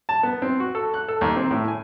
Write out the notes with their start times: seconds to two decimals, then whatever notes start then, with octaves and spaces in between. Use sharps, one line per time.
0.09 A5
0.23 B3
0.42 C4
0.60 F#4
0.75 A4
0.94 F#6
1.08 A4
1.21 D#2
1.36 C4
1.51 A2
1.68 G#5